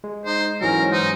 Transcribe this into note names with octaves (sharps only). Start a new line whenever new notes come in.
G#3
D#4 C5
G#2 E3 F#3 C#4 A#4
F#3 D#4 C5